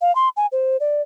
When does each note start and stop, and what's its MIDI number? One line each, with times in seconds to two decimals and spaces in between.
0.01 0.14 77
0.15 0.29 84
0.37 0.46 80
0.52 0.77 72
0.80 1.02 74